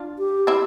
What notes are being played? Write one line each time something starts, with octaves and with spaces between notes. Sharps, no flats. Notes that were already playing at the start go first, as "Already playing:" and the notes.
Already playing: D4 F4
G4
C4 E4